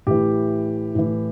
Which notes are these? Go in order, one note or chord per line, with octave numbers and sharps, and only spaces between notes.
A2 E3 G4
A2 E3